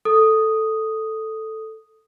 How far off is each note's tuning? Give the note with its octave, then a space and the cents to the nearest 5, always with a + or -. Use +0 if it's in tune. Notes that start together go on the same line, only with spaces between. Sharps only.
A4 +0 D#6 +0